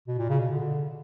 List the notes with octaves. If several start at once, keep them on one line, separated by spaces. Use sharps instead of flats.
B2
A#2
C#3
B2
D3